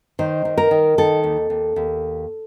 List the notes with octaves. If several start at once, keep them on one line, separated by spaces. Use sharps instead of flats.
D#3 C5
D#3
A#4
D#3
D#3 A4
D#2
D#2
D#2